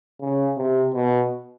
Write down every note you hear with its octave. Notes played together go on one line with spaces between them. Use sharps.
C#3
C3
B2